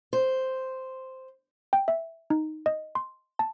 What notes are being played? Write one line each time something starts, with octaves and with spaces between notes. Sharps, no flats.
C5
G5
E5
D#4
D#5
C6
A5